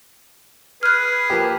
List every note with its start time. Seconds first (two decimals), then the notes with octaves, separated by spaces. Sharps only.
0.83 G#4 B4 F6 F#6
1.30 F3 A#3 G4